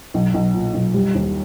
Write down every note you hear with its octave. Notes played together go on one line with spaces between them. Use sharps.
B1
B1
A#2
B1
G3
D#2